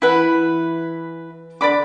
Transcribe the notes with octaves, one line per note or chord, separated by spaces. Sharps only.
E3 E4 B4 F#5
D3 D5 B5 D6